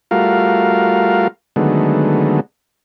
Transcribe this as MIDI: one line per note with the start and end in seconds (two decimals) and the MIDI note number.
0.11 1.28 55
0.11 1.28 57
0.11 1.28 65
0.11 1.28 66
0.11 1.28 70
0.11 1.28 77
1.56 2.40 50
1.56 2.40 51
1.56 2.40 54
1.56 2.40 56
1.56 2.40 57
1.56 2.40 59